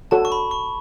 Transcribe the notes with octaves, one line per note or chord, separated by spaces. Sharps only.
F#4 A4 C#5 F#5 A5
C#6
B5
C#6